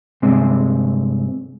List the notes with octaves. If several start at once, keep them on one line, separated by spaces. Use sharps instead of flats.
G2 C3 G#3 C4